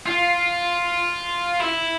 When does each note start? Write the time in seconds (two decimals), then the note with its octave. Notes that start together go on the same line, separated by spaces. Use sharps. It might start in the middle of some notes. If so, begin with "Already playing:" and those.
0.06 F4
1.60 E4